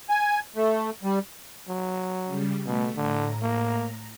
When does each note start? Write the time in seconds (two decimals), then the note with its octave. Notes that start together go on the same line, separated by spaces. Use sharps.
0.09 G#5
0.56 A3
1.03 G3
1.68 F#3
2.25 C#3 G3
2.66 B2 A3
2.96 A2 D3 A#5
3.42 A#3